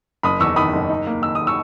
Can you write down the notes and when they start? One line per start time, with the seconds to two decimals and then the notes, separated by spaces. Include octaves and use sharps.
0.23 F#1 B5 D#6
0.40 E2 C#6 E6
0.56 D#3 B5 D#6
0.73 F#1
0.89 D#4
1.07 A#3
1.22 D#3 E6
1.35 D#6
1.47 C#6 E6